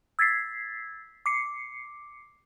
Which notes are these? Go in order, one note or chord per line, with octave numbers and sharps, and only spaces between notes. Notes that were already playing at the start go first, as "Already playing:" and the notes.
E6 G#6 A6 B6 C7
D6 C7 C#7